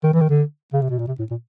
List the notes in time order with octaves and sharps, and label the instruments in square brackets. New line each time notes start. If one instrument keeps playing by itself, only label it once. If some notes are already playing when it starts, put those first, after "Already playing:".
[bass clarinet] D#3
E3
D#3
D3
C#3
C3
B2
A#2
C3
A2
A#2